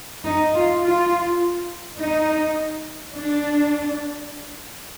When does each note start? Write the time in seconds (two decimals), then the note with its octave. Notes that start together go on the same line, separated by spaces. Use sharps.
0.24 D#4
0.54 F4
0.83 F4
1.99 D#4
3.15 D4